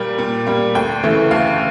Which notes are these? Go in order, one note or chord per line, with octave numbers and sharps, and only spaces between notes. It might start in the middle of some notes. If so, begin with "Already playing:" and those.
Already playing: A#2 G3 A#3 G5
A#2
G3 A#3
D2 G5
C#3 E3 A3
D2 F5